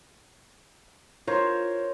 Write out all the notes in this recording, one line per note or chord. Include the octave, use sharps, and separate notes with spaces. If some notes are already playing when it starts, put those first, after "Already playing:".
F4 A#4 C5 C#5